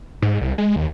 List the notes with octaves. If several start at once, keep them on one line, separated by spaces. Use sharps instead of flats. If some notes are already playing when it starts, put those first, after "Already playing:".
G#2
C2
G#3
D#2